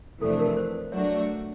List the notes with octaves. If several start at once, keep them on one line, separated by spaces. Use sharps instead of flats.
F2 C3 E3 A3 D4 A4
C5
A#4
B4
C5
F#3 A3 D4 F#4 C#5